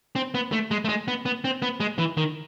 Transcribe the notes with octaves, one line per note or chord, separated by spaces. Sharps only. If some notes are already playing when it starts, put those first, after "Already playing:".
C4
B3
A3
G#3
A3
G#3
B3
B3
C4
B3
G#3
E3
D#3